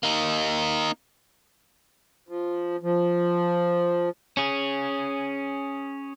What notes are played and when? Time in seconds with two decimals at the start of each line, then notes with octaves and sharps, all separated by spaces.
0.03 A#3 D#4
2.29 F3
2.83 F3
4.37 C#4 G#4